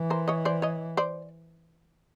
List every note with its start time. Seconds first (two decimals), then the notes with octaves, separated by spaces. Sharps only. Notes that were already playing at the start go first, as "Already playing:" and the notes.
Already playing: E3
0.10 A#4 C5
0.28 C#5 D#5
0.45 C5 D5
0.62 C#5 D#5
0.97 C5 D5